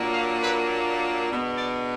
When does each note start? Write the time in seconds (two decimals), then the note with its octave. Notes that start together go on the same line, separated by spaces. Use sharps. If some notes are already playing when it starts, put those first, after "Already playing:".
Already playing: A#2 F#3 A#3 D4
0.13 F5
0.42 B4
1.29 B2 G#3 B3 D4
1.58 D5